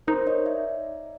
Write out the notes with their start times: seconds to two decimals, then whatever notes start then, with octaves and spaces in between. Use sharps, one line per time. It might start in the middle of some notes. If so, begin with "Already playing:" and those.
0.07 D#4 A#4 C5
0.27 C#5 D#5
0.46 D5 E5